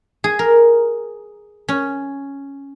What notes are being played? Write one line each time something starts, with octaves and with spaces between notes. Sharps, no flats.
G#4
A#4
C#4